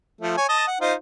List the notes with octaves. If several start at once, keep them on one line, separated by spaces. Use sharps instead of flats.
F3 A3
C#5 G#5
D#5 A5
F#5
D#4 F4 C5